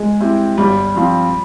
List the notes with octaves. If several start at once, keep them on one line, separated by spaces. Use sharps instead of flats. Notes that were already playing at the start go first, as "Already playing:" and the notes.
Already playing: G#3
G3 C4 E4 G4
G1 G3
G2 F3 C4 F4